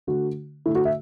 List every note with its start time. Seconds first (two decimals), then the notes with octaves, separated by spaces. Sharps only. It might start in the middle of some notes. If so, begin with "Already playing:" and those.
0.07 D3 A3 F#4
0.66 D3 A3 E4
0.75 F#4
0.85 E5